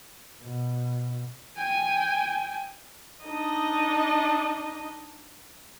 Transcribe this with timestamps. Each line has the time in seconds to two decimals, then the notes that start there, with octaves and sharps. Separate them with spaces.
0.42 B2
1.56 G5 G#5
3.24 D4 D#4 D#5